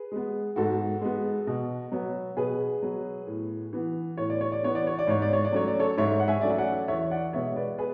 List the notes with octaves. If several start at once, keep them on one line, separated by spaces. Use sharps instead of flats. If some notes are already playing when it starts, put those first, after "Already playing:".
Already playing: G#4 B4
G#3 B3
G#2 F#4 A4
G#3 B3
B2
F#3 B3
B2 G#4 B4
F#3 B3
A2
E3 B3
A2 C#5
D5
C#5
D5
E3 B3 C#5
D5
C#5
D5
G#2 C#5
D5
C#5
D5
F#3 A3 C#4 C#5
D5
A4 C#5
G#2 C#5 E5
F#5
E5 G#5
F#3 A3 C#4 D5
E5
D5 F#5
E2 C#5 E5
D5 F#5
B2 G#3 B3 C#5 E5
B4 D5
G#4 B4